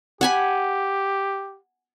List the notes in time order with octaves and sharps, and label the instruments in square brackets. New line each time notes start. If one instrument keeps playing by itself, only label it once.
[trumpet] G4 [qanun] F#5 G#5 B5